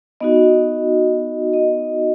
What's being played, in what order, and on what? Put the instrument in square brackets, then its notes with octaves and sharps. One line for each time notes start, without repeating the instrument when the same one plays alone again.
[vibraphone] B3 D#4 F#4 D#5
D#5